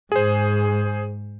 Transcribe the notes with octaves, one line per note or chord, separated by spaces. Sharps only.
G#2 G#4 C5